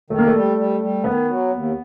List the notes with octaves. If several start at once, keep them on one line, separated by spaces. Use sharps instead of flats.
D#3 A3
A#3
A3
G3
G3
G3
D#3 B3
F#3
D#2